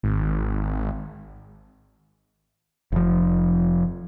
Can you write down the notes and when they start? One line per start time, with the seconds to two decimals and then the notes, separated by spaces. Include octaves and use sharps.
0.03 G#1
2.92 F1 F3